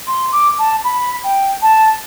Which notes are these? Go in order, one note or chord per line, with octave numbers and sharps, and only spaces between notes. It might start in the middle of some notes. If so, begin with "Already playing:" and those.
C6
D6
A5
B5
G5
A5